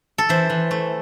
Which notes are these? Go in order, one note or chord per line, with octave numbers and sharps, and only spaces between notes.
A4
E3 C5
E3
A3